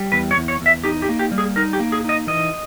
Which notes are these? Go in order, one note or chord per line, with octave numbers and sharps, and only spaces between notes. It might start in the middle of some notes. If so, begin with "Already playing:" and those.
Already playing: G3
E2 B4
C#5
E2
C#5
E2
E5
D#4 G4
G4
A#3
G4
G3
G#4
D#4 A#4
G4
A#3
G#4
D#4 D#5
E3 D#5